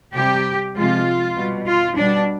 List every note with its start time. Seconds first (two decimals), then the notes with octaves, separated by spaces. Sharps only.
0.14 C3 G3 G4
0.76 C3 F3 G#3 F4
1.36 B2 G3
1.67 F4
1.97 B2 G3 D4